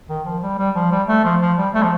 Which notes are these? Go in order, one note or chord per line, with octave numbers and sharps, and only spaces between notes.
D#3
F3
G3
G3
F3
G3
A3
F3
F3
G3
A3
F3